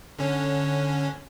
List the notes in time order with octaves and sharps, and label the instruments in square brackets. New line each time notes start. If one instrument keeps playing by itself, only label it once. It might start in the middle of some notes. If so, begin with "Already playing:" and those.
[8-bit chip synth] D3 C#4